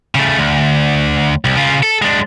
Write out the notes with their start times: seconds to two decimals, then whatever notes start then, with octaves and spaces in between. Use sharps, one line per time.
0.15 C#3 A3
0.39 D2
1.45 C2
1.56 C#3 F4
1.83 A4
2.02 G#3 D4